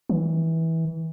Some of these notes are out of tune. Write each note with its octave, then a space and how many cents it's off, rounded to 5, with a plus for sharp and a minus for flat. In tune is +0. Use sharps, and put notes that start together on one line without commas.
E3 -20